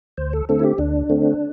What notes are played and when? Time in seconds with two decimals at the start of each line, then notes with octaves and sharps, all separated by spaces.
0.18 D2 C5
0.33 A4
0.49 D3 A3 C4 A4
0.59 E4
0.63 G4
0.78 D2 D4
1.10 D3 A3 C4